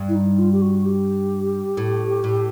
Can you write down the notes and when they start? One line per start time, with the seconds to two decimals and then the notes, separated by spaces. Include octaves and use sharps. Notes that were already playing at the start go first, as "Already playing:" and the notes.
Already playing: G2
0.09 E4
0.15 D#4
0.39 F4
0.52 G4
0.62 F#4
0.86 G4
1.77 A2
2.24 A2